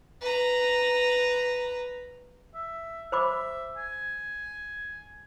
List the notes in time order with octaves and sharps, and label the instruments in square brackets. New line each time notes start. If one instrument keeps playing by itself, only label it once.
[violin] B4 A#5
[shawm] E5
[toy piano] C5 B5 D6 [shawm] E5
[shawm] G#5